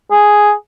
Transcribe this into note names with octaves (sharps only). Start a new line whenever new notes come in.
G#4